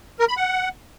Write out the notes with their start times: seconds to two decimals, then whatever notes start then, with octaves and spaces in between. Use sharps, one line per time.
0.20 A#4
0.28 B5
0.37 F#5